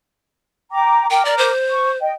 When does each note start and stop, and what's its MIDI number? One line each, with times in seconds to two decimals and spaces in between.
0.71 1.06 79
0.71 1.06 82
0.71 1.06 86
1.10 1.51 70
1.10 1.23 79
1.10 1.51 86
1.25 1.35 74
1.38 1.98 72
1.71 1.91 85
2.00 2.12 75
2.00 2.12 79